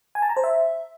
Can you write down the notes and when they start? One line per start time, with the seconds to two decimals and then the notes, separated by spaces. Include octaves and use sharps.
0.15 G#5
0.22 A5
0.29 A#5
0.37 C5
0.44 E5